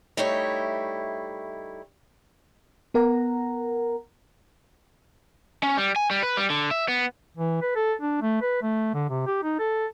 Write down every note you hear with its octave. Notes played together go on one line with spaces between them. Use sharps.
G3 A3 D#4 E4 C#5
B3 A#4 F#5 A#5
C#4
G3
G#5
G3
B4
G3
D3
E5
B3
E3
B4
A4
D4
A3
B4
A3
D3
C3
G4
D#4
A4